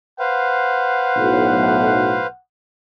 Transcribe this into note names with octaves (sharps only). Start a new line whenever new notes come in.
B4 C5 F5 F#5
B1 A2